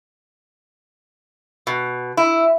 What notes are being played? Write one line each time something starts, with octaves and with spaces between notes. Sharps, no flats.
B2
E4